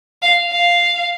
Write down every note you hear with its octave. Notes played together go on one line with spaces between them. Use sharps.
F5
F5